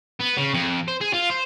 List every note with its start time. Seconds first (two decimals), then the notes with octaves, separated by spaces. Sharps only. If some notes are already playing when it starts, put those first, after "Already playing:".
0.20 B3
0.37 C#3
0.54 F2
0.88 C5
1.01 G#4
1.13 F4
1.30 C5